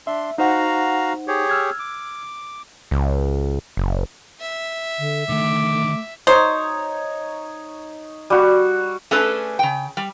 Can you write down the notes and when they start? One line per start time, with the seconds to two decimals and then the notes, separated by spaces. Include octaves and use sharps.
0.07 D4 E5 C6
0.38 D#4 F#4 C5 F5 F#5 A#5
1.28 G4 G#4 C#5
1.49 E6 F6 G#6
1.79 D6
2.91 C#2
3.77 F#1
4.40 E5
4.99 D3
5.29 D3 D#3 A3 D6
6.27 D#4 C5 C#5
8.30 G3 F#4
9.11 A3 C#4 D4 G#4 A4 B4
9.59 C#3 G5
9.97 G3